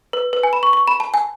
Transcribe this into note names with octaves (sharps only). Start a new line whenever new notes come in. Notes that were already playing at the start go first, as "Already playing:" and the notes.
B4
B4
G#5
B5
C#6
C#6
B5
A5
G#5